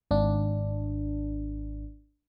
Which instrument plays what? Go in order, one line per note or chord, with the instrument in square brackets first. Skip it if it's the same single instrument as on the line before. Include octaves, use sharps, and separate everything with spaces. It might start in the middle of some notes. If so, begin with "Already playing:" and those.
[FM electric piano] G#1 D4